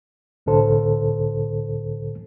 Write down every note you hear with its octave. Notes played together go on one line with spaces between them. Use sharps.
C2 A2 D3 A4 C5